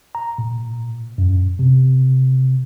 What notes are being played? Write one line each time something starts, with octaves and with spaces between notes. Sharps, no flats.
A#5
A#2
F#2
C3